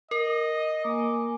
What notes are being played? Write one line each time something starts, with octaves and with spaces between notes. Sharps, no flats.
A#4 D#5
A#3 G#5 D6